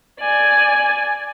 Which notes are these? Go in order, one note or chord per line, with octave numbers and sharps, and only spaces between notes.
D5 G#5